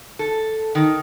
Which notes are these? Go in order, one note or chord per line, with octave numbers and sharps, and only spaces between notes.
A4
D#3